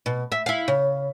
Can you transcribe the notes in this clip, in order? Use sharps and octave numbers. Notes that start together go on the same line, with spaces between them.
B2
E5
E4 F5
C#3